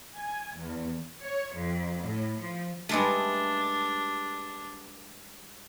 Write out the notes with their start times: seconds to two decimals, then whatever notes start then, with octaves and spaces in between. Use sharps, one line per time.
0.15 G#5
0.56 E2
1.21 C#5
1.54 F2
2.01 A2
2.39 F3
2.89 G2 G#3 A3 D4